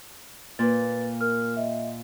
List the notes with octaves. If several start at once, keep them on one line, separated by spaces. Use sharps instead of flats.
A#2 B4 A6
A#4 F6
D#5 E5